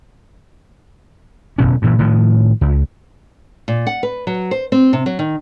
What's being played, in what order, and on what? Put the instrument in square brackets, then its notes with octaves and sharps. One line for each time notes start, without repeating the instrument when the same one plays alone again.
[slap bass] D1 C#2 B2 C#4
G2 A#2 E3
A2 D#3 F3
C#2
[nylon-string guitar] A#2
F#5
B4
F#3
C5
C4
C3
F#3
D#3